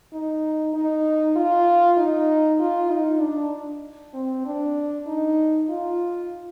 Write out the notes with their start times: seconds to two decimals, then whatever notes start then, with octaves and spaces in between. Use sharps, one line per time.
0.13 D#4
0.74 D#4
1.36 F4
1.98 D#4
2.60 F4
2.91 D#4
3.21 D4
4.14 C4
4.46 D4
5.07 D#4
5.69 F4